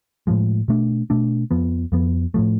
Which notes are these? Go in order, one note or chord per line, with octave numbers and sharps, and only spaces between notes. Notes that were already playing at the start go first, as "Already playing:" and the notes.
A2 F3 G#3
B2 A3 D4
B2 A3 D4
F2 F3 B3
F2 F3 B3
A2 F3 A3